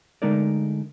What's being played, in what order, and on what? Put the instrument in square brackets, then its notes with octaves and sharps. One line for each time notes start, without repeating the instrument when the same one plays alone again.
[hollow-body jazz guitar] D3 G#3 A3 D#4 A#4 D5